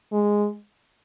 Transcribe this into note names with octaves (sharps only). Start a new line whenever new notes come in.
G#3